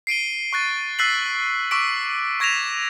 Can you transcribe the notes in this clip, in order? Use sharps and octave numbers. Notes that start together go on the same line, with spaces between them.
C7 D7 D#7 G7
C#6 F#6 A6
E6 F#6 A6 B6 C7 F#7
C#6 D6 E6 B6 D7
C#6 G#6 A#6 B6 E7 F7